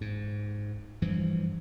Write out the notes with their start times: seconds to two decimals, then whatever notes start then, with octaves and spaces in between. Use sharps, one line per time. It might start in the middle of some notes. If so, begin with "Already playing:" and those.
0.01 G#2
1.02 G2 E3 F3